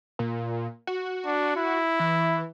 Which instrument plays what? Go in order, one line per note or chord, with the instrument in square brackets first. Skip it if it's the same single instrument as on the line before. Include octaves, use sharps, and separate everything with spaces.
[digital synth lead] A#2
F#4
[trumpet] D4
E4
[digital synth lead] E3